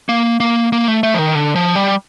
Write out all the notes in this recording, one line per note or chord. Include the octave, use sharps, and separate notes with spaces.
A#3
A#3
A#3
A3
A3
F3
D#3
D3
F3
G3